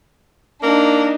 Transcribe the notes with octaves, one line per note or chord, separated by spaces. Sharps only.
A#3 D4 D#4